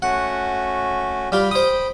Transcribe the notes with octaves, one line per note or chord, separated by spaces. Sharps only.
A3 C#4 F#4 F#5
G3 F4 G5 B5
C5 D#6